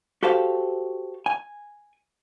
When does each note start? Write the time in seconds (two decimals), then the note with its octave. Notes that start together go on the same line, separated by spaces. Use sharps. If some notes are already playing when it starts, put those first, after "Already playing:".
0.23 F#4 G4 A4 C5 F5
1.26 G#5